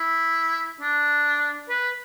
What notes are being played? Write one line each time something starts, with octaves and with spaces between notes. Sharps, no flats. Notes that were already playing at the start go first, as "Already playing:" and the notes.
Already playing: E4
D4
B4